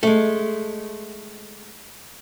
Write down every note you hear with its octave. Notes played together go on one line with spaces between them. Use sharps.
G#3 A3